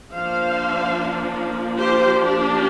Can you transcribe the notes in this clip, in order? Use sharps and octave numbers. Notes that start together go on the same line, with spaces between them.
F3 A#3 D4 C5 F5
G4 C5
D4 G4